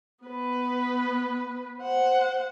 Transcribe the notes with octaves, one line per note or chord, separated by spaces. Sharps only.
B3 B4
C5 F#5